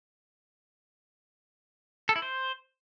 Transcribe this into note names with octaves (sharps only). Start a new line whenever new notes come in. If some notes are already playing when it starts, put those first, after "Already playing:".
A4
E4
C5